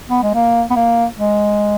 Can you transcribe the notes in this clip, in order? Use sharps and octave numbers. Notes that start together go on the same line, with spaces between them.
B3
G#3
A#3
B3
A#3
G#3